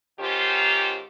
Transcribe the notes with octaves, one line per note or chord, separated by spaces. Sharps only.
G#2 D#3 C#4 F4 G4 C5